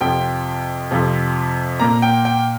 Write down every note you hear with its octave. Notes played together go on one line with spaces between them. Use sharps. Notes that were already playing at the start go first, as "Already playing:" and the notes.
F2 C3 F3 G5
F2 C3 F3
A#2 A#3 A#5
G5
G5